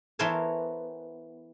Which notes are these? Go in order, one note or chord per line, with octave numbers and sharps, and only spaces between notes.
E3 B3 A4 A#4 C5 C#5